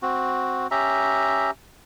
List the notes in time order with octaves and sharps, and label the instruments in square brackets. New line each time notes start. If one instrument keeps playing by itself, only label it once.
[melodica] C4 F#4
C#4 G4 E5 A#5